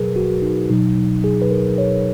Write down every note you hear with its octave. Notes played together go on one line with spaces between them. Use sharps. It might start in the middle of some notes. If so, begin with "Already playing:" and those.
Already playing: B2 F#3 G#4 A#4 B4
F#4
D#4
B2 F#3 D#4
G#4
B4
A#4
C#5